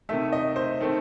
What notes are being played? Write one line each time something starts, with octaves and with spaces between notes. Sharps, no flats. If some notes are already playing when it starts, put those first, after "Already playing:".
C3 D#3 A3 E5
D#5
C5
D#3 A3 C4